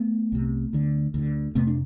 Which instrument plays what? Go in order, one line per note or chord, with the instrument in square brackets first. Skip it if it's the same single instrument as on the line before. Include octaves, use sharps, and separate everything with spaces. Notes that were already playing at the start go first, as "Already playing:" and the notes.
Already playing: [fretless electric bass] A3 B3
C2 C3
D2 D3
D2 D3
F2 C3 A3 B3
D4